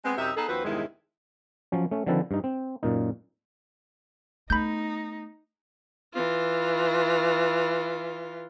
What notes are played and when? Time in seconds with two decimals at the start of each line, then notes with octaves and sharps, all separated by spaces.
0.05 G#3 B3 C4
0.18 F#2 C3 D#4 E5
0.36 B3 D#4 G#4 A4
0.49 D#2 F3 C4 F#4 B4
0.65 E2 G2 C3 D#3 G#3 E4
1.72 F3 F#3 C#4
1.91 A3 C#4
2.06 D3 D#3 F3 C4 A4 B4
2.31 G2 D#4
2.44 C4
2.83 F#2 A#2 D#4
4.50 A3 B3 D#4 B5 G6
6.14 E3 F4